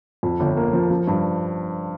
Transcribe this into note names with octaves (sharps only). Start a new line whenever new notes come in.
F2
G1
A#3
F3
F3
G2